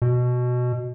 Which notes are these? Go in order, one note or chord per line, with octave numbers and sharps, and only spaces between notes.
B2